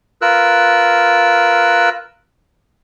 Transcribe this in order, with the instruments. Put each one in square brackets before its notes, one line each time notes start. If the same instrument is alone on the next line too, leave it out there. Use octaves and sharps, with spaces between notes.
[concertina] F4 A#4 B4 E6 F#6